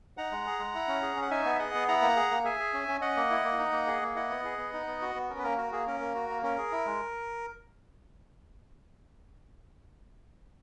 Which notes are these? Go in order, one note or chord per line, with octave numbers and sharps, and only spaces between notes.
D#4 F#5 A#5
G#3
G#4
G#3
E4
C#4
G#4
C#4
F#5
D#4 E5 G#5
B3
E5
G#4 D#5 F#5
B3
E4 F#5 A#5
A#3
G#4
A#3
G#4 E5 G#5
G#4
C#4
C#4
C#4 D#5 F#5
A#3
E4
A#3
D#4
A#3
G#4
A#3
E4 D#5 F#5
B3
G#4
B3
D#4
B3
F#4
B3
C#4 A#4
B4
A#3 A#4
F#4 A#4
A#3 G#4
C#4 A#4
A#3
F#4
A#3
C#4 A#4
G#4
E4
G#3